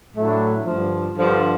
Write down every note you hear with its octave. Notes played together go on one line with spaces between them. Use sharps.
A2 F#3 A3 D4
G2 D3 F3
G2 D3 F3